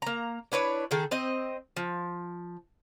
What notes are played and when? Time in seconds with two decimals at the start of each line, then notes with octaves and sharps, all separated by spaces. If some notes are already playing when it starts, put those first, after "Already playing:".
0.02 A#3 A#5
0.52 D4 E4 B4 C#5
0.91 D#3 G#4 A4
1.11 C4 D#5
1.77 F3